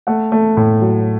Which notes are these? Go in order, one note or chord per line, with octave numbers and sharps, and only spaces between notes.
A3 F#5
A3
A2
F#3